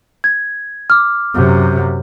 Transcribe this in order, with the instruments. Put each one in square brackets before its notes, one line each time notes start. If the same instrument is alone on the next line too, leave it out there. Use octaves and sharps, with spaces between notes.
[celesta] G#6
D6 F6
[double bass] F#2 C3